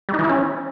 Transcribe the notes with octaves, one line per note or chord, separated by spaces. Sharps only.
G3
D#4
E3
E4
C#4